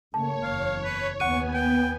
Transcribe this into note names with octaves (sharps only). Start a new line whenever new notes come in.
C#3 A3 A#3 C#5 A5
F#1 E2 F5
B4
D#2 B3 F#5 G#5 C#6 F#6 D#7
G5